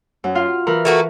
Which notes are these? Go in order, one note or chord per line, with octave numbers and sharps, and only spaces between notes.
F#2
F4 F5
E3 A#4 B5
A3 A#3 F#4